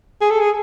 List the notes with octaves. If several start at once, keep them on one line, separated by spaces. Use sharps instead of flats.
G#4
A4
G#4